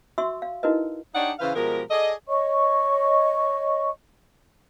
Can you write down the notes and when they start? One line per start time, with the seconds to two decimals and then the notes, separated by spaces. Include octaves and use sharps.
0.18 F#4 E5 C6 C#6 E6
0.42 F5
0.63 D#4 E4 F#4 A#4 B4 D#5
1.15 D4 D#4 G4 C#5 D5 F#5
1.39 C#3 E3 B4 C5 F5
1.54 B2 F3 G#3 G4 A#4
1.90 G#4 A4 D5 D#5
2.27 C#5 D#5 C#6